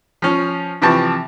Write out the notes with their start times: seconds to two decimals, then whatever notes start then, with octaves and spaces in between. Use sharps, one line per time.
0.22 F3 C#4
0.82 C3 E3 F3 G5 A5 C#6